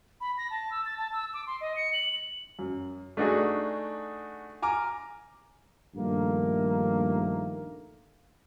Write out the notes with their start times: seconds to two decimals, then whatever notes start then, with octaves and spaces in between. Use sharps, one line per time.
0.21 B5
0.38 A#6
0.50 A5
0.71 E6
0.86 A6
0.98 A5
1.13 E6
1.34 D6
1.47 C6
1.61 D#5
1.76 C#7
1.93 F#7
2.59 F#2
3.17 A3 D4 D#4 F#4 G#4
4.62 G#5 A#5 D6 F6
5.95 A#1 G2 D#3 A3 A#3